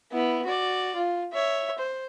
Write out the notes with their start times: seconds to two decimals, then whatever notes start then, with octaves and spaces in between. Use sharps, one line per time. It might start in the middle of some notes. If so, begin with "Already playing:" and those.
0.12 B3 E4
0.46 F#4 D5
0.96 F4
1.33 C#5 E5
1.78 C5